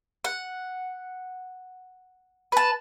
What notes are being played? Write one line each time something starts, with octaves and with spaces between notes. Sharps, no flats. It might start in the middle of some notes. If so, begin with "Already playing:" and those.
F#5
B4 A5